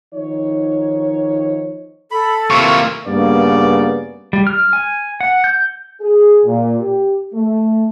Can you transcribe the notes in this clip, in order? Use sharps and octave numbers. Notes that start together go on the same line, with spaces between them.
D#3 F3 D#4 C#5
A4 B5
C3 A#3 E4 F4 F5 C#6
G2 C#3 A#3 B3 D5
G3
F6
G#5
F#5
G6
G#4
A#2
G4
A3